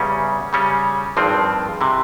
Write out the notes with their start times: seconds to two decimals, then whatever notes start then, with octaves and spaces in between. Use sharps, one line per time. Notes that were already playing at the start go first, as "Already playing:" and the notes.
Already playing: E2 C#3 G3 C#4
0.53 C#3 G3 C#4
1.17 G#1 G2 F3 C4
1.81 C3 E3